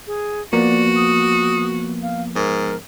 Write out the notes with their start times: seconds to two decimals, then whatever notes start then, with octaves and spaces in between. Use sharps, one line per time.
0.07 G#4
0.53 F3 A#3 B3 F#4 D5
0.96 D#6
2.03 F5
2.36 G#2 A#4